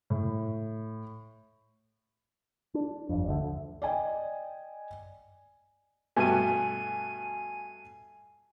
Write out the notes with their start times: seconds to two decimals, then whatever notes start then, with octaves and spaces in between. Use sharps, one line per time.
0.10 A2
2.74 D4
3.09 G1 F2
3.28 D2 D3
3.82 D5 D#5 G5 G#5
6.16 G2 B2 A3 G#5 D#7